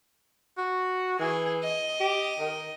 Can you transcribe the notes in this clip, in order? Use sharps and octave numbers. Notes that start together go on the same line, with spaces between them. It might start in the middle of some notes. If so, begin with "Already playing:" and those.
F#4
E3 G#4
D#5
G4
D#3